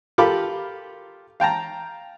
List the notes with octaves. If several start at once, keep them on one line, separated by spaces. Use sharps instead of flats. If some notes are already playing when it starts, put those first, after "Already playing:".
F4 G4 A4 A#4 B5 D6
F5 G5 A5 A#5